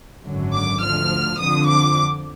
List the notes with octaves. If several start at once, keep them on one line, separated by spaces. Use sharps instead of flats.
G#1 F#2 D3 F#3
D6
D2 D3 F3 F6
F2 D3 F3 D#6
D6